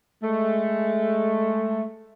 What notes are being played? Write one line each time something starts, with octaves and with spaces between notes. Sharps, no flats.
G#3 A3